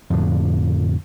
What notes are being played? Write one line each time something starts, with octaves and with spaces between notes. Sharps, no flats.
F2 A2 D3